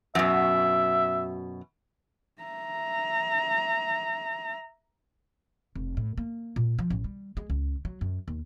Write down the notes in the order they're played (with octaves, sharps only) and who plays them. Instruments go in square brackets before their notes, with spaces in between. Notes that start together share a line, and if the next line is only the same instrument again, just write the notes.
[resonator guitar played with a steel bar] F#2 B2 [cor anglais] E5
[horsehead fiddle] E5 A#5
[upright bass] F1
A2
A#3
A#2
F3
A1
G3
G#3
C#2
F#3
F#2
D#2